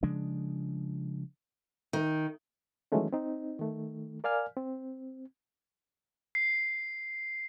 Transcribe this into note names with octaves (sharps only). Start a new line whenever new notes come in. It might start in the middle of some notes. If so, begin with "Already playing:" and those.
C#3 F3 G#3 D4
D#3
D#3 E3 F#3 G#3 A3 C#4
C4 D#4
D#3 A3
A#4 D5 F5 G#5 F6
C4
C7